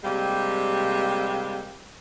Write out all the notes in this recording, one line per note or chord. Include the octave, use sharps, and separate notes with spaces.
C3 G3 G#3 A#3 D4 G4